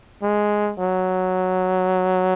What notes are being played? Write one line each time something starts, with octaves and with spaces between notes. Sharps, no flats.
G#3
F#3